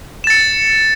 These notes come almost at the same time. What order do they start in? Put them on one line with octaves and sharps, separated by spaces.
E7 A6 C#7